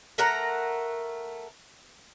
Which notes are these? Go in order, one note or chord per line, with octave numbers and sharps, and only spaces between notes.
A3 A#4 F#5 A#5